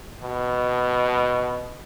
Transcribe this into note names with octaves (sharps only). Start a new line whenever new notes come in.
B2